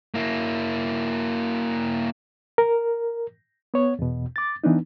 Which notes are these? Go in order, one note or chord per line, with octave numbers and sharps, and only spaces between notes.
A#3 E4
A#4
B3 C#5
E2 B2
D6 A6
E3 B3 D4 D#4